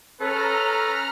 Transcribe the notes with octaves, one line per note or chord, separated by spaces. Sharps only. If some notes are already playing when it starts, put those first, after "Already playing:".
C#4 A4 B4 A#5 F6